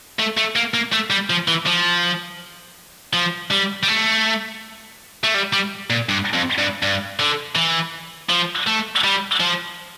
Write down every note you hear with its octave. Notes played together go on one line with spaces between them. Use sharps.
A3
A3
A#3
A#3
A3
G3
F3
E3
F3
F3
G3
G3
A3
A3
G3
G3
A#2
G2
F2
G2
G2
D3
E3
F3
A3
G3
F3